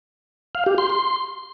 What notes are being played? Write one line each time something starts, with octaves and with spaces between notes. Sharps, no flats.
F5
G4
C6
C6